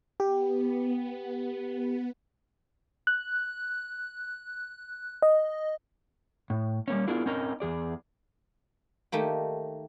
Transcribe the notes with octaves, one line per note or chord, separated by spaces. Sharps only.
B3 G4
F#6
D#5
A2
G3 A#3 C#4
B3 D4 E4 F4 G#4 A#4
C4 C#4 D#4 A#4 D#5 A#5
E2 G#4 D5
D#3 A3 A#3 G4